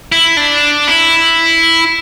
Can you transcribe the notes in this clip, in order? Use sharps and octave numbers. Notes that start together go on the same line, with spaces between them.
E4
D4
E4